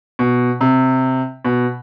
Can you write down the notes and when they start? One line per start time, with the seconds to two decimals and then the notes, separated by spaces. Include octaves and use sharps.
0.19 B2
0.61 C3
1.45 B2